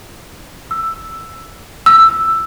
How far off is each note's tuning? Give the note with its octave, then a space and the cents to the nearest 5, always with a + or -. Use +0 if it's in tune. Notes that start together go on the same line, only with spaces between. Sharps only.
E6 +5
E6 +5